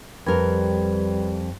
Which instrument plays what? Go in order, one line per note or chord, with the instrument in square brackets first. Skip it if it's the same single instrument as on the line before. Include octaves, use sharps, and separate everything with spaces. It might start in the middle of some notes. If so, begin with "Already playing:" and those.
[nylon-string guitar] F2 A#4 [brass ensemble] G3 [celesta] B4 B5 G#6